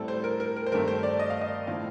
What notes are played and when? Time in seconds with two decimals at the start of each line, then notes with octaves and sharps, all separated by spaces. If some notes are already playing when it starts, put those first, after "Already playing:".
Already playing: A2 G3 C4 A4
0.08 C5
0.24 A#4
0.40 A#4
0.56 A#4
0.66 C5
0.72 G2 D#3 A3 C4 A#4
0.88 C5
1.03 D5
1.19 D#5
1.30 F5
1.41 D#5
1.67 A2 F3 C4 F5